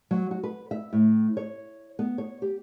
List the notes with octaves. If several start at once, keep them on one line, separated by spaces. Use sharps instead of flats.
F#3
F#4
B4
E5
A2
C#5
B3
C#5
G4